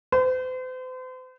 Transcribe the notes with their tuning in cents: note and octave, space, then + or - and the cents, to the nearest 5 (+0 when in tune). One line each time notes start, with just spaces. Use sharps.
C5 -40